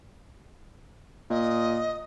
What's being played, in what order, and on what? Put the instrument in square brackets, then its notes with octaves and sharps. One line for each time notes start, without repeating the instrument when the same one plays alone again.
[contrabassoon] A#2 [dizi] D#5